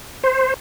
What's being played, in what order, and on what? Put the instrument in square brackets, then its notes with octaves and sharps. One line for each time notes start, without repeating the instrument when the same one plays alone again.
[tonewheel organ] C5